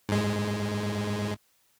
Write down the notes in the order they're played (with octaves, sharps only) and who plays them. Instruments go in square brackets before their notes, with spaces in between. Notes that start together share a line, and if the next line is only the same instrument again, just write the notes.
[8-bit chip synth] G#2 G#3